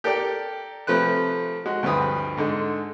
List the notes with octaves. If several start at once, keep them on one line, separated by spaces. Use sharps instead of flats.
G4 A4 A#4 D5 G5
C3 F3 A3 B4 F#6
G#3 F#4
D2 G2 F3 B4 D#6
G#2 D3 G#3